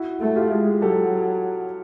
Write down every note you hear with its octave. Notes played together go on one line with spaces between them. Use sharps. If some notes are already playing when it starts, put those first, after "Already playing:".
Already playing: E4 F#4
A3
F4 G4
G#3
F#3 G4 A4